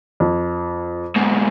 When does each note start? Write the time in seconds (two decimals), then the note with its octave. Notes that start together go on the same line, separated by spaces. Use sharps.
0.20 F2
1.16 G#2 B2